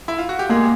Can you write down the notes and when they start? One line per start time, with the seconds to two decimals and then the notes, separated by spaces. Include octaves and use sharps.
0.08 E4
0.18 F4
0.29 F#4
0.39 G4
0.49 G#3 A#3 G#4